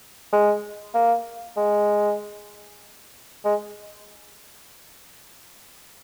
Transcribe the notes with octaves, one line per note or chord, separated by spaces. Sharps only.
G#3
A#3
G#3
G#3